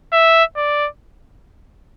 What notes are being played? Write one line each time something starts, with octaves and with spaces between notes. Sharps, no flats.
E5
D5